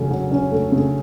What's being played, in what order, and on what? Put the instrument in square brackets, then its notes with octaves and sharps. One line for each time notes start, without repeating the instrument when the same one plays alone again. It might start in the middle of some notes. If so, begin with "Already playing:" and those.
Already playing: [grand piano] C#3 F#3 A3 C#4
F#3
C#4
A3
C#3